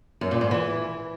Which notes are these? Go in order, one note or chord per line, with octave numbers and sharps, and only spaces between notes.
F#2
A#2
G#2
E3